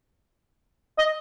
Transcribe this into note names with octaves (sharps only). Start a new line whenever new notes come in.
D#5